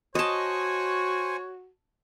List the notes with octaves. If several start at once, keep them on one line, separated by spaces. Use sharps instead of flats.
F#4 C5 C#5 D#5 G#5 A5 C#6